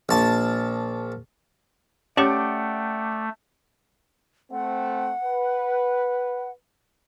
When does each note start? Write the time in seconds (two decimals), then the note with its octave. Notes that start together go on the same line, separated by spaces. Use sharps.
0.09 A#1 A5
2.17 A3 C#4 G4 C#5 D5 F#5 G5 D6
4.52 A3 C4 F#5
5.24 B4